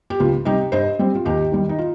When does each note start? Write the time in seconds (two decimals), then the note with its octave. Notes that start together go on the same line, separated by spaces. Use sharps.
0.10 G4
0.20 C#2 F4
0.45 C3 G3 D#4 G4
0.72 G2 C5 D#5
0.99 G3 C4
1.15 F4
1.25 D#2 D#4 G4
1.52 D#3 G3
1.69 D#4
1.78 F4